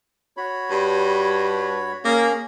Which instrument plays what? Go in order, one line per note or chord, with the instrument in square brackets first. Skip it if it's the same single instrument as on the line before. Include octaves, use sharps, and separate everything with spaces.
[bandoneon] F#4 C#5 B5
[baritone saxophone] G2
[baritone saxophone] A#3 [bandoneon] C#4 G#4